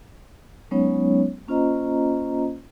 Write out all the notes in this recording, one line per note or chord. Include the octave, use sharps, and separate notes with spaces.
F#3 G#3 B3 C#4 D#4 C#5
A#3 C#4 F4 C5 D#5 A#5